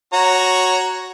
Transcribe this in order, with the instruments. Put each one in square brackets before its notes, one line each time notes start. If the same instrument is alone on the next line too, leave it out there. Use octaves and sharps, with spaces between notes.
[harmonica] F#4 C#5 A#5